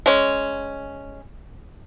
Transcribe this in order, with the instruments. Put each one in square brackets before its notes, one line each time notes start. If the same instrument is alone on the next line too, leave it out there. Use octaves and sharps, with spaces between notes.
[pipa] G#3 C#4